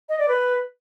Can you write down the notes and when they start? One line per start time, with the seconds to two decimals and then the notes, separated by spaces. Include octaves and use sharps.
0.09 D#5
0.19 D5
0.28 B4